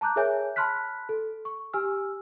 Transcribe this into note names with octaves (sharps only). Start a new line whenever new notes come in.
A5 A#5 D6 F#6 G6
G#4 A#4 C#5 E5 G#5 G6
A5 B5 C6 F6 F#6 B6
A4
C#6
G4 G#5 E6 F6